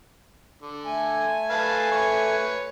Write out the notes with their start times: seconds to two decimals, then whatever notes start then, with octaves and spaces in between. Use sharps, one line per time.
0.61 D3
0.85 A3 G#5
1.50 B4 F5 A5
1.92 B4 C#5 C#6